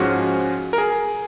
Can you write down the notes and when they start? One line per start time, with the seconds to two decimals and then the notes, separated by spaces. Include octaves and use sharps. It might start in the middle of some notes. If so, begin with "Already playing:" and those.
Already playing: G#2 F3 G#3 C#4 F#4
0.73 A#4
0.78 G#4